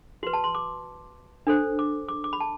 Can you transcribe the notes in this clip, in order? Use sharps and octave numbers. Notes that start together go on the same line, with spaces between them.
F#4 B4 C6
A5
C6
D6
D4 A4 C5
D6
D6
D6
B5
A5